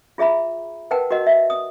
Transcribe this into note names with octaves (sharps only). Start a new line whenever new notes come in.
F4 G#4 E5 A#5 B5
A#4 B4 F#5 G5 A5
F#4 A#4 D#5 F#5
E5
D#6